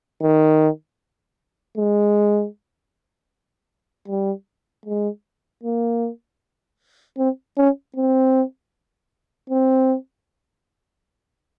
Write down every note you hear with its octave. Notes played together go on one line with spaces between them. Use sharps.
D#3
G#3
G3
G#3
A#3
C4
C#4
C4
C4